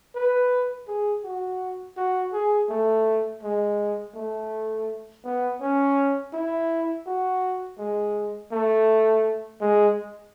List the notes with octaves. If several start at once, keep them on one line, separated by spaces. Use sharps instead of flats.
B4
G#4
F#4
F#4
G#4
A3
G#3
A3
B3
C#4
E4
F#4
G#3
A3
G#3